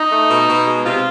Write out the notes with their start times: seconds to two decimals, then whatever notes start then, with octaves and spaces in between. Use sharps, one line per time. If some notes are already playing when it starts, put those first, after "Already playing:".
Already playing: D#4
0.11 A3
0.30 B2
0.49 B2
0.67 G#3
0.85 C3 F4